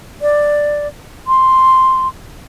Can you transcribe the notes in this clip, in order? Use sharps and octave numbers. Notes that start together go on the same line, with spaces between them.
D5
C6